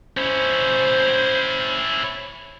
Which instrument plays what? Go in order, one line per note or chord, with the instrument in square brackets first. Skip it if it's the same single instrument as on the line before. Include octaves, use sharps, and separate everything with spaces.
[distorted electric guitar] C#4 E4 [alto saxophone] C5